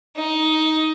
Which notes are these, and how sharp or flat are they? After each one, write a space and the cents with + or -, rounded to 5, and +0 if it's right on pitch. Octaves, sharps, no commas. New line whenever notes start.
D#4 +10